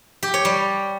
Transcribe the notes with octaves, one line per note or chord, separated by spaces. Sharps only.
G4
C#5
G3